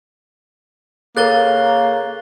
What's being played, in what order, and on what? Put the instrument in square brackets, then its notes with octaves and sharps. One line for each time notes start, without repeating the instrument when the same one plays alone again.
[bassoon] C#3 [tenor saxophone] A#3 [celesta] A4 A#4 [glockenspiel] F#6 A6 G7